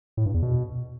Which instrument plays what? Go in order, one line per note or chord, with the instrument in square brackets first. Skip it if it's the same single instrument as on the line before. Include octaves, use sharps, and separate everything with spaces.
[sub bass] A2
G2
E2
B2